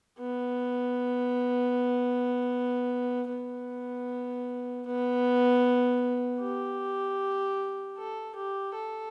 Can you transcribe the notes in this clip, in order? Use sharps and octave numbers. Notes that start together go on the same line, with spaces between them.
B3
B3
B3
G4
A4
G4
A4